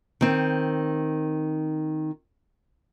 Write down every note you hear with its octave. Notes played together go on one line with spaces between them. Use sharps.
D#3 C4